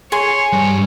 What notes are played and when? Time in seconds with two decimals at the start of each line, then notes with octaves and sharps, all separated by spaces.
0.12 G#4 C#5 G#5 C6
0.53 G2